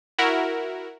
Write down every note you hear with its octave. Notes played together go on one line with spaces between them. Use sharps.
E4 F#4 A#4